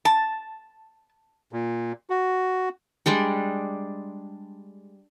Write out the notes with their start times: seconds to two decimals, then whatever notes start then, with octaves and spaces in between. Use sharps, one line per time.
0.05 A5
1.53 A#2
2.10 F#4
3.06 G3 G#3 D4 G4